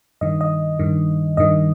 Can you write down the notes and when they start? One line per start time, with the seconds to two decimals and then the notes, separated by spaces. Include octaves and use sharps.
0.21 G2 D#3 D#5
0.41 D#5
0.79 G2 D#3
1.37 G2 D#3 D#5